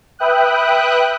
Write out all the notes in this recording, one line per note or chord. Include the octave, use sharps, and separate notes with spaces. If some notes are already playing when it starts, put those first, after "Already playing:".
B4 E5 G5 D#6 F#6